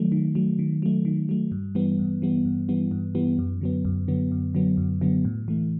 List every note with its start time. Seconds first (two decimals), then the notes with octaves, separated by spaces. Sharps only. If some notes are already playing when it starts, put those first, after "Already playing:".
Already playing: D#3 F#3 A3
0.12 D#3
0.35 F#3 A3
0.59 D#3
0.82 F#3 A3
1.05 D#3
1.29 F#3 A3
1.52 G2
1.75 E3 G3 B3
1.99 G2
2.22 E3 G3 B3
2.45 G2
2.69 E3 G3 B3
2.91 G2
3.15 E3 G3 B3
3.39 F#2
3.61 D3 F#3 B3
3.85 F#2
4.08 D3 F#3 B3
4.32 F#2
4.55 D3 F#3 B3
4.77 F#2
5.01 D3 F#3 B3
5.25 A2
5.48 E3 A3